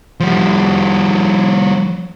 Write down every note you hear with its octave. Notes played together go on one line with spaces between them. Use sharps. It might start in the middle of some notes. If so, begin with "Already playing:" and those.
F3 G3